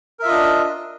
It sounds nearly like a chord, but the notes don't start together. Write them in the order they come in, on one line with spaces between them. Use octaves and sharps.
A#4 E5 F4 D#5 D4